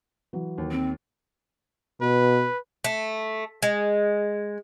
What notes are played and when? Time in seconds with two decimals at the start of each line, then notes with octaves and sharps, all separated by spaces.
0.33 E3 F#3
0.58 D#2
0.71 C4
2.02 B2 B4
2.84 A3
3.63 G#3